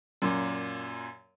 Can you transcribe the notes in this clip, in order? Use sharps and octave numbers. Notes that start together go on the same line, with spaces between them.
F#2 A#2